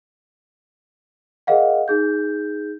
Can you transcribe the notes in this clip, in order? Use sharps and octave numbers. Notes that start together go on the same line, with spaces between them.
G#4 A#4 D#5 F5 F#5
D#4 G#4 G6